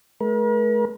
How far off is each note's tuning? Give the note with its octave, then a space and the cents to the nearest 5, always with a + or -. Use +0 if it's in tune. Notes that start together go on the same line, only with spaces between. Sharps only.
A3 -40 A#4 +45